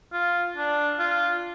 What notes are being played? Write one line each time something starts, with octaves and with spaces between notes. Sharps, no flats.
F4
D4
F4